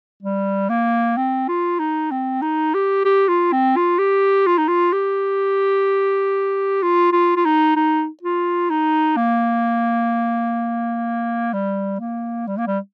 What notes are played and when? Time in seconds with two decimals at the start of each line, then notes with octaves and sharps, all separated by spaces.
0.23 G3
0.69 A#3
1.17 C4
1.48 F4
1.79 D#4
2.11 C4
2.42 D#4
2.74 G4
3.05 G4
3.28 F4
3.53 C4
3.76 F4
3.99 G4
4.46 F4
4.58 D#4
4.68 F4
4.93 G4
6.82 F4
7.13 F4
7.36 F4
7.45 D#4
7.76 D#4
8.23 F4
8.70 D#4
9.17 A#3
11.53 G3
12.00 A#3
12.47 G3
12.58 A#3
12.67 G3